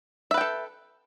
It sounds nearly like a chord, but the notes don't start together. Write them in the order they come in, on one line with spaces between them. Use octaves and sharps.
E5 B4 G5 A4